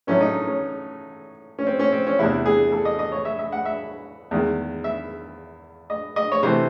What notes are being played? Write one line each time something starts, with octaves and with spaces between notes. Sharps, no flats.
A2 F#3 A3 C#4
D#4
C#4
C#4
C4
C#4
C4
C#4
E2 C3 E3 E4
G#4
A4
D#5
D#5
C#5
E5
E5
F#5
E5
E2 D#3 G#3
E5
D#5
D#5
C#5
C3 E3 A3 C5